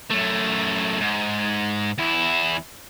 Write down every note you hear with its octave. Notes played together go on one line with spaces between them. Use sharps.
F#2 A3
G#2
E2 E4